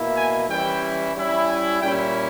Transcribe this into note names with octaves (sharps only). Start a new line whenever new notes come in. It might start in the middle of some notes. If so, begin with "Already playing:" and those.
Already playing: B2 A#3 E4
G#5
E3 G3 C#4 E4 G5
G3 C#4 E4
G#5
A#2 G3 C#4 E4 G5